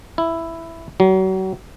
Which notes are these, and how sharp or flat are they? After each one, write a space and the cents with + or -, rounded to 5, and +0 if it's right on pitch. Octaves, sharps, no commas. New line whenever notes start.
E4 +5
F#3 +35